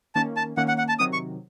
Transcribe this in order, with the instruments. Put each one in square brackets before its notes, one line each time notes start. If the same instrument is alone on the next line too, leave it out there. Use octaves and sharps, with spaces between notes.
[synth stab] D#3 A#3 C#4 [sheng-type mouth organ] A5
[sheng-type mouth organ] A5
[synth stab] D#3 A#3 C#4 [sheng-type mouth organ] F#5
[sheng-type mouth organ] F#5
F#5
A5
[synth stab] C3 D#3 F#3 [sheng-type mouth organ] D#6
[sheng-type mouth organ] C#6